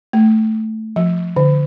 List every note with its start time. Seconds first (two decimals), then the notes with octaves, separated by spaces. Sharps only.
0.13 A3
0.96 F3
1.36 D3